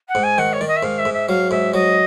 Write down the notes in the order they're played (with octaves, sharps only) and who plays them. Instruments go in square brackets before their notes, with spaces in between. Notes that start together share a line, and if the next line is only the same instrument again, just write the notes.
[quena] F#5
[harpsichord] G#2
[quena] G#5
[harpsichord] D#3 [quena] F#5
[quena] C#5
[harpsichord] D#3 [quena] D5
[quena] D#5
E5
[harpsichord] G#2 [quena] F5
[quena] E5
[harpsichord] G#2
[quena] E5
[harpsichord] F#3 [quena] F5
[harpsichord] G#2 [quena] E5
[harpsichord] F#3 [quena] D#5